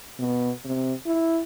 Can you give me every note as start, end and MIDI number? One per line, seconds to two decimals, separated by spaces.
0.20 0.50 47
0.65 0.93 48
1.06 1.39 64